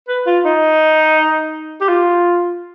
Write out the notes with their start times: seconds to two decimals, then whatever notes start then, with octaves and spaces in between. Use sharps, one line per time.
0.08 B4
0.26 F4
0.45 D#4
1.81 G4
1.89 F4